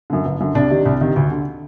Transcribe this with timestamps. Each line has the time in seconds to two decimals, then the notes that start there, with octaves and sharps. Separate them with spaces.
0.10 F#2 D3
0.25 G1
0.40 F#2 D3
0.55 C2 D4
0.71 C3 D#3
0.86 C2
1.01 C3 D#3
1.16 D2
1.31 D3